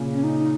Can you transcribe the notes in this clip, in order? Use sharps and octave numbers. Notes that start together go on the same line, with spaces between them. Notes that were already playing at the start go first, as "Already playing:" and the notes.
Already playing: A#2 C#3
C#4
D#4